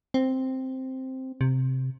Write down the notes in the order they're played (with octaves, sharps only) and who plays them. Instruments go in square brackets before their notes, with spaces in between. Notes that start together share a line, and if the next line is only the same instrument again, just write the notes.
[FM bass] C4
C3